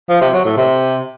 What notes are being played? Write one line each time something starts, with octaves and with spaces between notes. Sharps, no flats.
F3
C3
F#3
A2
C3